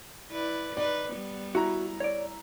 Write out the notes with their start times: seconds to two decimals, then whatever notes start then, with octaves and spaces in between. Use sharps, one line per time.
0.31 E4 B4 D5
0.77 D#4 B4 D5
1.11 G3 B3
1.55 E4 F#4 A#5
2.00 C#5 D5